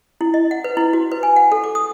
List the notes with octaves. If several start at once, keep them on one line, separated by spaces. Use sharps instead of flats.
E4
D#5
F#5
B4
E4
F#4
B4
G#5
F#5
A4
D6
D#6